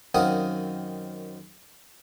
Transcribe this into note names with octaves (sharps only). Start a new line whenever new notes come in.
F#2 D#3 C4 F5 F#5 D#6